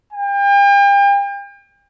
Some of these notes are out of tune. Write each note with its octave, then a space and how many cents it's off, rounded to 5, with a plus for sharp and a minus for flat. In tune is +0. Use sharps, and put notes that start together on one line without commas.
G5 +40